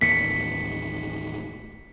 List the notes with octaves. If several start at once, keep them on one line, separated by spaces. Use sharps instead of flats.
A1 D#2 A2 B6 C#7